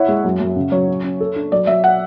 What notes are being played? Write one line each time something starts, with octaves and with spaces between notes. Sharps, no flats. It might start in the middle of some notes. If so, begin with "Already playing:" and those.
Already playing: E4 C#5 E5 F#5
G#3
F#2
F#2
C#3
F#3 C#5
C#4
C#4
A4
D4
F#3 D5
F#3 E5
F#5